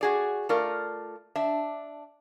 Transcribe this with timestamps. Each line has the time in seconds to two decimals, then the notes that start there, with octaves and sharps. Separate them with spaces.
0.01 F#4 G#4 D5
0.49 A3 F4 A#4 D5
1.36 D4 E5